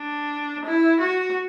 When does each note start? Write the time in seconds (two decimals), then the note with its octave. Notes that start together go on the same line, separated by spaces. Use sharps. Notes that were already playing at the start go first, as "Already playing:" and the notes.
Already playing: D4
0.65 E4
1.00 F#4